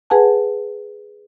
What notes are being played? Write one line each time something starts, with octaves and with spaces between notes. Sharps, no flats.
G#4 B4 F#5 G#5 A5